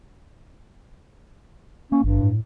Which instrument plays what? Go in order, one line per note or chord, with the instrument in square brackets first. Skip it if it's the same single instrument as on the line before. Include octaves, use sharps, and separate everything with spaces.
[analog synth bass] A#3 [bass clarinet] C#4
[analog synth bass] G#1 [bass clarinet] G2
[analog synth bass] A2